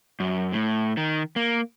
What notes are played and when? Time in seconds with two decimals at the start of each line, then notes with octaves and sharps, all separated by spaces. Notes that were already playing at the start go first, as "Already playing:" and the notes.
0.20 F#2
0.53 A2
0.97 D#3
1.36 A#3